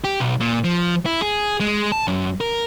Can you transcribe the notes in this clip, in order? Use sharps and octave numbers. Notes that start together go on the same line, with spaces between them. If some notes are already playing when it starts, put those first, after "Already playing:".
G4
B1
A#2
F3
E4
G#4
G#3
A5
F#2
A#4